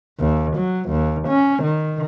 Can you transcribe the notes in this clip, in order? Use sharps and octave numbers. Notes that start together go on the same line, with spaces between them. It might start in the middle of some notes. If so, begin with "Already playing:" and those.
D#2
F#3
D#2
C#4
D#3